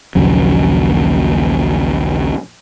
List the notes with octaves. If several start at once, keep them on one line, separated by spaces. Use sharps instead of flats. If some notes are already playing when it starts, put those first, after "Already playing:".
A#1 D#2 C#3 F#3